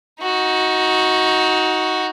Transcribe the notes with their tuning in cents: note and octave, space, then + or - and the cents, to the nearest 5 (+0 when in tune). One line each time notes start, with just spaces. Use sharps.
D#4 +20 F#4 +0